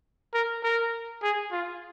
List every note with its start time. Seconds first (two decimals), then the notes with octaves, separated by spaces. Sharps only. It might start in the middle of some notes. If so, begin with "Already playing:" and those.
0.34 A#4
0.63 A#4
1.23 G#4
1.52 F4